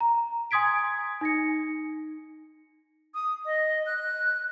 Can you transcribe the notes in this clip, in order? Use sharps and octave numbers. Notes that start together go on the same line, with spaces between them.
A#5
G#5 C6 D#6 G#6 B6 D7
D#4 A#6 C#7
D#6
D#5
F#6